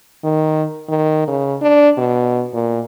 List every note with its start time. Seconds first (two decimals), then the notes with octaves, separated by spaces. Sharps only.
0.24 D#3
0.89 D#3
1.28 C#3
1.61 D4
1.98 B2
2.54 A#2